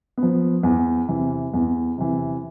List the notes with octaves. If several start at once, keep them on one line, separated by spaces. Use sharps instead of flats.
B3
F3
E2
C3 E3
E2
C3 E3